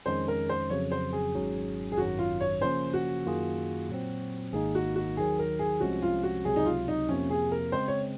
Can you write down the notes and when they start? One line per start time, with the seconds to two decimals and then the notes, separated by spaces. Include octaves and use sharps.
0.06 F2 D#3 G#3 C#4 C5
0.28 A#4
0.49 C5
0.70 F2 C#3 F#3 C#5
0.92 C5
1.13 G#4
1.34 G#1 G#2 F#3 C#4
1.92 G#4
1.98 G#1 F#2 D#3 F#3 F#4
2.19 F4
2.40 C#5
2.61 C#3 F3 A#3 C#4 C5
2.94 F#4
3.26 F#2 D#3 A#3 F4 G#4
3.89 A#2 F#3 C4
4.53 G#1 G#2 D#3 A#3 D#4 G#4
4.75 F#4
4.96 F#4
5.17 D#2 D#3 F#3 G#4
5.39 A#4
5.59 G#4
5.80 C2 C3 F3 G#3 C#4 F#4
6.02 F4
6.23 F#4
6.45 C#2 C3 F#3 G#4
6.56 D#4
6.66 F4
6.88 D#4
7.09 F2 C3 F3 A#3 C#4
7.30 G#4
7.51 A#4
7.72 C#3 G#3 C4 C5
7.88 C#5